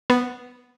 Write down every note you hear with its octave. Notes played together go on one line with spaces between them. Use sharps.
B3